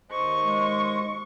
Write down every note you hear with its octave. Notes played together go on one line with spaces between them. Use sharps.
D#2 C5 D#5 C#6
G#3